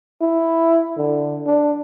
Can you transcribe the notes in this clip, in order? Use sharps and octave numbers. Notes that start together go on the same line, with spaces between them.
E4
D3
D4